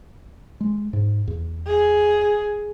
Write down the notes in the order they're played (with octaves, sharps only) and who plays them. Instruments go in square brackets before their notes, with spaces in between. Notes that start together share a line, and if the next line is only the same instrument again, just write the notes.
[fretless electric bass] G#3
G#2
E2
[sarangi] G#4